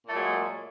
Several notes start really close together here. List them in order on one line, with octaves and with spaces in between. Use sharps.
A#2 A3 F#3 G#3